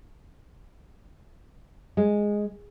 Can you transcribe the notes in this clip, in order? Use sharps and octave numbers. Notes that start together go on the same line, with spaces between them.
G#3